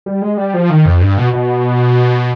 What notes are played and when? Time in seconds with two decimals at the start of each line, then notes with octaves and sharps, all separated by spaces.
0.06 G3
0.22 G#3
0.37 G3
0.54 F3
0.70 D#3
0.86 F2
1.01 G2
1.18 B2
1.33 B2